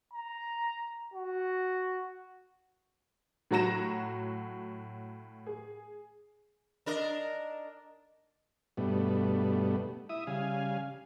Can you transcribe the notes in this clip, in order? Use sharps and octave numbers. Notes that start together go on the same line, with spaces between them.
A#5
F#4
A2 F#3 F#4 A#5 A#6 E7
G#4
D4 A#4 D#5
G2 B2 G3 A3 B3
E4 E5 D#6
C#3 G3 F5 G#5